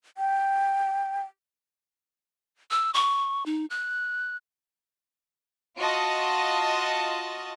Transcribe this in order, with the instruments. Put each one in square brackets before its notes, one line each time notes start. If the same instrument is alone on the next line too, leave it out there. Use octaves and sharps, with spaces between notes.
[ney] G5
[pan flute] E6
C#6
D#4
F#6
[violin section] F4 F#4 D#5 A5